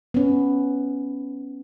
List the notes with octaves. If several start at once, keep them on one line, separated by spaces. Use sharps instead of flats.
B3 C#4